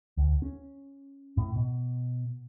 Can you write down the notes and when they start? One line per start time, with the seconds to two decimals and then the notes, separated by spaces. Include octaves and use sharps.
0.17 D2
0.42 C#4
1.37 A2
1.56 B2